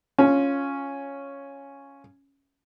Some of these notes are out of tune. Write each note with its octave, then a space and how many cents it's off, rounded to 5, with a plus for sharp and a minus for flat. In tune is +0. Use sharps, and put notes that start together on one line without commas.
C#4 +0 F4 +5